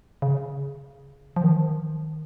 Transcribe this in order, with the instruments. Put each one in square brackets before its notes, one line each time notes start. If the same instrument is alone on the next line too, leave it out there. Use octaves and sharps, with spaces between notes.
[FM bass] C#3
F3
D#3